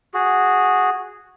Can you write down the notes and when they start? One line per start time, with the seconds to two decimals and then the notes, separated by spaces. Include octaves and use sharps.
0.14 F#4 G#4